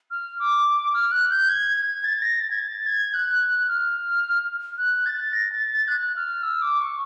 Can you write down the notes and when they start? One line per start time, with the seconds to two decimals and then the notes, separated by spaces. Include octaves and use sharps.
0.11 F6
0.40 D6
0.94 F6
1.12 F#6
1.30 G6
1.49 G#6
1.77 G#6
2.04 A6
2.22 A#6
2.40 A6
2.51 G#6
2.59 A6
2.86 G#6
3.14 F#6
3.68 F6
4.78 F#6
5.06 A6
5.33 A#6
5.52 A6
5.70 A6
5.88 F#6
6.16 F6
6.43 E6
6.62 D6
6.80 C#6